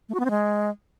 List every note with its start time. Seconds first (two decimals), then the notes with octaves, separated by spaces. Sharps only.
0.09 A3
0.14 F#4
0.20 B3
0.25 C4
0.30 G#3